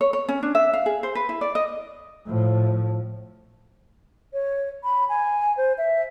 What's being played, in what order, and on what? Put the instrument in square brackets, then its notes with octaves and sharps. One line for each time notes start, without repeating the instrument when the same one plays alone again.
[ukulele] C#5
C#5
C#4
D4
E5
F5
G#4
C5
B4
E4
D5
D#5
[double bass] A2 F3
[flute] C#5
B5
G#5
C5
E5